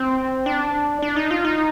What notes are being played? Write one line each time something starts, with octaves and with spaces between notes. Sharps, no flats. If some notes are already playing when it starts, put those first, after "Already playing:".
Already playing: C4
D4
D4
D#4
F4
D#4